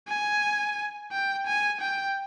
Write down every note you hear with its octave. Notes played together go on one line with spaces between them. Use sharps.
G#5
G5
G#5
G5